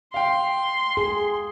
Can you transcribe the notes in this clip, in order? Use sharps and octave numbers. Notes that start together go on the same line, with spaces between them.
F5 G5 C6
G#4